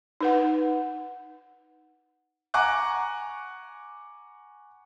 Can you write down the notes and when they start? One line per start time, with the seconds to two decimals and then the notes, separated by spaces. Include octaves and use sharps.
0.21 D#4 B4 F#5
2.54 F#5 G#5 A#5 C#6 D6 F#6